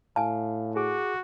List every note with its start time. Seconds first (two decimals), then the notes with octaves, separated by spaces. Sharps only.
0.16 A2 F5 G#5 A5
0.76 F#4 G#4 D6